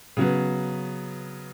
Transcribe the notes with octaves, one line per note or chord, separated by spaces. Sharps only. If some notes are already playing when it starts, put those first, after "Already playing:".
C#3 F#3 B3